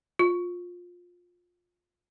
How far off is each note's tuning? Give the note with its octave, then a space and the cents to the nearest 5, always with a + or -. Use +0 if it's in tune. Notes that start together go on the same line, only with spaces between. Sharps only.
F4 +20